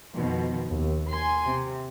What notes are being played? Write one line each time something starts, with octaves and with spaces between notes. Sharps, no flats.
F2 B2 D#3 F3
D#2
G#5 C6
C3